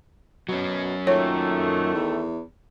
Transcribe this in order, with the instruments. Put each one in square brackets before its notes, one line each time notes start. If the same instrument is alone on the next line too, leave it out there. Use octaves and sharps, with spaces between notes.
[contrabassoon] B2 [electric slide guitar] F#3 C#4
[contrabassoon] A#2 [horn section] D#3 A3 [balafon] C#5
[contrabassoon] E2